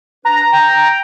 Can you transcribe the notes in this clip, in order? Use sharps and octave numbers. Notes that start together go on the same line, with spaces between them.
D4 B4 A#5
G5